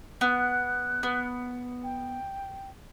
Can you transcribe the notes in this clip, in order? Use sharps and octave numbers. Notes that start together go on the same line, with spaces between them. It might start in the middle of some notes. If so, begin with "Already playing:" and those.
B3 F#6
B3
G5